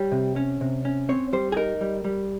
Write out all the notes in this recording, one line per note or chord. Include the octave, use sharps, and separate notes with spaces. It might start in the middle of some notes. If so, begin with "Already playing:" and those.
Already playing: G3 C#5
C3
C#4
C3
C#4
C4 C#5
G3 C5
G#4
D#4 A#4
G3
G3